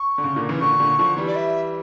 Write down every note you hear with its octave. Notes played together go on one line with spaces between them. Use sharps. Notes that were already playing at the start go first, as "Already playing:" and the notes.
Already playing: C#6
D3
C#3
A#2 D3
C#3 E3
A#2 D3 C#6
A#2 D3
D3 F3
E3 G3
D5
E5